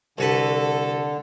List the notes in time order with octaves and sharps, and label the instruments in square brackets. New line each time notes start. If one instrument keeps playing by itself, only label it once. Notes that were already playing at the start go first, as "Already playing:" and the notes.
[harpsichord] C2 F#4 B4 [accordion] D3 [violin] A4